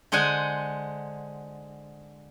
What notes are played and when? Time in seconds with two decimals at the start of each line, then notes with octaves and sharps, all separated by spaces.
0.12 D3 G#3 C5 F#5 G#5